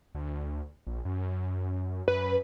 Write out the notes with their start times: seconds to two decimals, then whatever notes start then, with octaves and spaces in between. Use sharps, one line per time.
0.15 D2
0.87 A#1
1.05 F#2
2.08 F#2 B4